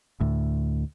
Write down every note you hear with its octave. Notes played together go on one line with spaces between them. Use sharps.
D2 A2